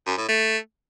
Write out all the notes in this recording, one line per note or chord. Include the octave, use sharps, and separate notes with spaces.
F#2
A2
A3